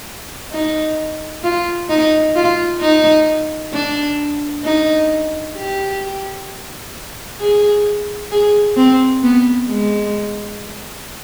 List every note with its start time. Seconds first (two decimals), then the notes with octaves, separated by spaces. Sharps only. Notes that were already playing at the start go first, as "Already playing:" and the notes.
0.52 D#4
1.43 F4
1.89 D#4
2.35 F4
2.81 D#4
3.73 D4
4.64 D#4
5.56 G4
7.40 G#4
8.31 G#4
8.77 C4
9.23 B3
9.69 G#3